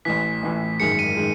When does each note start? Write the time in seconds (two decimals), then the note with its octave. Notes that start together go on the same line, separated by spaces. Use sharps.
0.05 A1 A2 E3 B6
0.43 A1 A2 E3
0.80 G#1 F#2 D#3 G#3 C#7
0.99 D#7
1.17 D#3 G#3